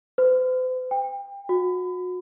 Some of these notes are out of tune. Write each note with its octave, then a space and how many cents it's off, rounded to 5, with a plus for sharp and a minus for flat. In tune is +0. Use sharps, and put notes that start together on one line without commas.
C5 -45
G5 +30
F#4 -30